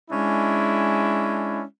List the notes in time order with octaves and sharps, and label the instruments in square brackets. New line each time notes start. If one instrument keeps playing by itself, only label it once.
[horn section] G#3 C#4 D4 E4